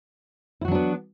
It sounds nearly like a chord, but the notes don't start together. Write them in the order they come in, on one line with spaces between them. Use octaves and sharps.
E4 F#4 F#3 D4 B3